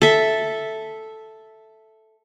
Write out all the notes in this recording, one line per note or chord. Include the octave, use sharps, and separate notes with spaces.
A4 E5